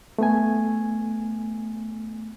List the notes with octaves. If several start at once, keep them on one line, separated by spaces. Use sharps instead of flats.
A3 B3 G#5